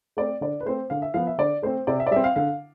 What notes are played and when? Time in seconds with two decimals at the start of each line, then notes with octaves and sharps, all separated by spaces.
0.17 A3 C4 D5
0.41 D3 D5
0.60 B4
0.66 A3 C4 C5
0.90 D3 F5
1.02 E5
1.14 F3 B3 F5
1.27 E5
1.38 D3 D5
1.63 A3 C4 C5
1.87 C3 D5
2.00 E5
2.06 D5
2.11 G3 E5
2.16 C4
2.24 F5
2.36 D3 F5